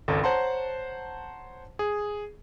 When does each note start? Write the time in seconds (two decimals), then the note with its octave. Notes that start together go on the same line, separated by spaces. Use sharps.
0.08 G#1 C#2 A4
0.24 C5 C#5 F#5 A5 A#5 C6
1.79 G#4